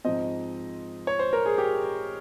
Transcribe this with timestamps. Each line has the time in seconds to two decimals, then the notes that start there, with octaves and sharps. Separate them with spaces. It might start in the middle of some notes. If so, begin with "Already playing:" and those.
0.05 G#2 F3 C4 D#5
1.07 C#5
1.19 C5
1.33 A#4
1.46 G#4
1.58 G4